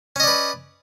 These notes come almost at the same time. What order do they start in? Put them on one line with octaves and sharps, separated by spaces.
C#4 D#5 D5 B4